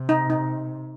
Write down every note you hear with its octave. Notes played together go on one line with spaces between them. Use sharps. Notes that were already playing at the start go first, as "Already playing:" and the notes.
Already playing: C3
D#4
D#4